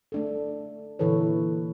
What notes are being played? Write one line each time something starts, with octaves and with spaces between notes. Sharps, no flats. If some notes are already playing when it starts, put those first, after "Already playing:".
A3 D4 A4
A#2 D3 E3 A4 B4 C#5